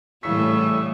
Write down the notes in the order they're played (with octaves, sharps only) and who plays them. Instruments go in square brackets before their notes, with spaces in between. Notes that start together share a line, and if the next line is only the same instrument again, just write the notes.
[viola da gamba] A2 G3 [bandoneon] C#3 C#6 E6 [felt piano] E3 B6